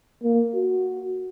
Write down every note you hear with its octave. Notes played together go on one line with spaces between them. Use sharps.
A#3
F#4